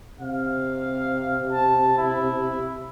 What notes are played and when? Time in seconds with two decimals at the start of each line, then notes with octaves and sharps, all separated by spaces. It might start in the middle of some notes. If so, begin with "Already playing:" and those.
0.21 C3 F5
1.53 A5
1.98 E4